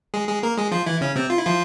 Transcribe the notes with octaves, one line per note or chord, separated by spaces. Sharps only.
G#3 G#4
G#3 G#4
A#3 A#4
G#3 G#4
F3 F4
E3 E4
C#3 C#4
C3 C4
F4
E4
F3 F4